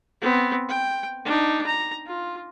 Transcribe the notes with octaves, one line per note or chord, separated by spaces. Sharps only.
B3 C4
G5
D4 D#4
A#5
F4